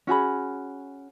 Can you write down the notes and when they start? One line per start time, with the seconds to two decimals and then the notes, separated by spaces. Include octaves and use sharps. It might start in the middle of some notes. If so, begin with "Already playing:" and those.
0.07 C#4 F#4 G#4 B5